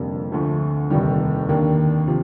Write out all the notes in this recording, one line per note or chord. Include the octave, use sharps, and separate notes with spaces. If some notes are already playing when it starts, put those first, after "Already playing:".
Already playing: F1 F2 D3 G3 A#3
D2 D3 F3 A3
F1 D#2 D#3 G3
D#2 D#3 A#3 D4
C3 F3